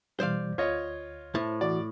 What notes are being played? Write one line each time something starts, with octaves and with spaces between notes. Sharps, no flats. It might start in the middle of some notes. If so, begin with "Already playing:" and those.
B2 E3 G3 C5 D5 F5
D2 F4 C#5 D#5 G#6
A2 E4 C5 A5
E3 F#4 D5